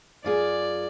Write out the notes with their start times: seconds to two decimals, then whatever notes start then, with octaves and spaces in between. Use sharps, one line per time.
0.24 F#2 F4 G#4 D5